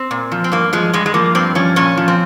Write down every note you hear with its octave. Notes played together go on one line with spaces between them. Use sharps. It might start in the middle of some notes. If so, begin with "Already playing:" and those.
Already playing: C4
A#2
F3
C4
G2 A#3
F3 G#3
G2 G#3
G#3
F3 A#3
G2 C4
F3 C#4
A#2 C#4
F3
C4